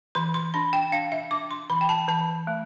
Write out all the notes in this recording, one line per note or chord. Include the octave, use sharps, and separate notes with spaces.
E3 C6
C6
D4 B5
G5
D4 F5
E5
D4 D6
C6
E3 B5
G5
A5
E3 A5
A3